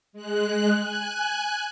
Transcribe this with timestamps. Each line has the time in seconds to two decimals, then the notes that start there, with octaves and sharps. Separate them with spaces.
0.13 G#3 F#6
0.76 G#5 F#6